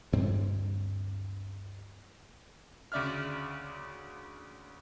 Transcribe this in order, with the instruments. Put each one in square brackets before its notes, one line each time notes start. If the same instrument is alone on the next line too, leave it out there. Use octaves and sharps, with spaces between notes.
[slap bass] D2 G2 C4
[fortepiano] D2 C#3 D5 E5 F6